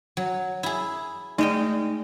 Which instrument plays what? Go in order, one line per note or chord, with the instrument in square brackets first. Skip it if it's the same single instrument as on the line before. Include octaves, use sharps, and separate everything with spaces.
[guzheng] F#3
E4 G#4
[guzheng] G#3 D#5 G5 [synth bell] A3 D5 [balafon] D#4